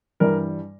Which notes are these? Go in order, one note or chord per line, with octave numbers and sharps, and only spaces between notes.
G2 E3 G3 A#4